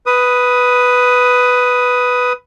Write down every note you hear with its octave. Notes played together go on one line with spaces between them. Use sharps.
B4 D#6